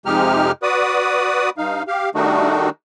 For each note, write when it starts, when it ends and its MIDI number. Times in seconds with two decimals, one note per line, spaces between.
0.06 0.52 41
0.06 0.52 48
0.06 0.52 56
0.06 0.52 63
0.06 0.52 67
0.06 0.52 89
0.63 1.50 66
0.63 1.50 71
0.63 1.50 74
0.63 1.50 87
1.58 1.83 43
1.58 1.83 63
1.58 1.83 77
1.88 2.10 67
1.88 2.10 77
2.15 2.69 51
2.15 2.69 55
2.15 2.69 57
2.15 2.69 62
2.15 2.69 63
2.15 2.69 66